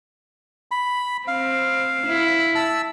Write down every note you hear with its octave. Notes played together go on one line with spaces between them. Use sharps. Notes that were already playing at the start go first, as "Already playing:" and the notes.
B5
C4 F5
E4
A5 E6